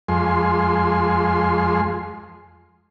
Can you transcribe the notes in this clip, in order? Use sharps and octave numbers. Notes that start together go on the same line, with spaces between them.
F2 G#3 C6